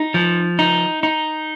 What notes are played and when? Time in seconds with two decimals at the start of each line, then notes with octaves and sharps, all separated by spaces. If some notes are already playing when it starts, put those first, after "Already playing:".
Already playing: D#4
0.14 F3
0.59 D#4
1.03 D#4